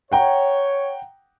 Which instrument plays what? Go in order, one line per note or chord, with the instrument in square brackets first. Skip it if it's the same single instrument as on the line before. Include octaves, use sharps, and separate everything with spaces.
[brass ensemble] C#5 [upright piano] F#5 G5 A#5